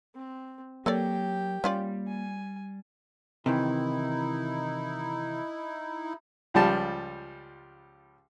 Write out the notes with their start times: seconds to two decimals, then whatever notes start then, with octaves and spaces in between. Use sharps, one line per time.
0.15 C4
0.86 F#3 A#3 G4 A4 C#5 D5 G5
1.64 G3 C#4 F4 D5
2.08 G#5
3.46 C3 D#3 E3 D#4 E4
6.54 C#2 F3 G3 A5